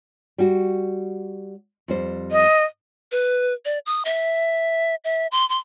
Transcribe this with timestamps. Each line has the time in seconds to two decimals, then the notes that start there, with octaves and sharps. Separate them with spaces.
0.38 G3 F#4
1.88 F2 G3 C5
2.31 D#5
3.12 B4
3.65 D5
3.86 D#6
4.05 E5
5.04 E5
5.32 C6
5.49 C6